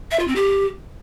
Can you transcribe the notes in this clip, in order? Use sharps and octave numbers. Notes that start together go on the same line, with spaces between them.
E5
F4
C4
G4